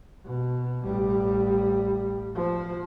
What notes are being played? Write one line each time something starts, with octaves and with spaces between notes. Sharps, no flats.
B2
A1 G3
F3